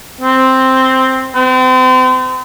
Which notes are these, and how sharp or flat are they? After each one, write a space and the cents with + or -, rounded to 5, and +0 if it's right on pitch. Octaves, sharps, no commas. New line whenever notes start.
C4 +0
C4 -35